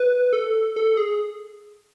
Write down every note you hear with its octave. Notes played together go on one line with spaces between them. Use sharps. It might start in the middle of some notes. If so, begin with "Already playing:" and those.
Already playing: B4
A4
A4
G#4